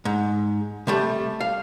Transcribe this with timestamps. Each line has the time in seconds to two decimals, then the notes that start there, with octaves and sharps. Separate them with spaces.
0.05 G#2
0.87 C3 G3 A3
1.41 F5